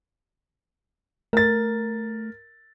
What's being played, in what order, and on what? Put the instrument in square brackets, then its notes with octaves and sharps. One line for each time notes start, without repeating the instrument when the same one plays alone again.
[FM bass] A3 [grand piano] A#4 A6